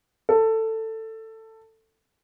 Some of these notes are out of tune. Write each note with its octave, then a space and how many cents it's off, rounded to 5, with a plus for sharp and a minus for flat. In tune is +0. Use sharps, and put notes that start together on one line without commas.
A4 +15